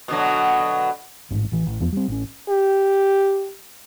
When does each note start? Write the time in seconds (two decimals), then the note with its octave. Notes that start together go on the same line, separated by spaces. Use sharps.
0.08 B2 D3 F#3
1.31 A1 G#2
1.52 A1 E3
1.66 A1
1.80 F#1 E2 F3 B3
1.93 G3 C4
2.08 A1 C#4
2.49 G4